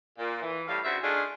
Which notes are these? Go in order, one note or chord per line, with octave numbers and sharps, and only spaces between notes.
A#2
E3
A2 G3 F5
C#3 D4 F#4 C5 E5
A3 D4 D#4 F4 G#4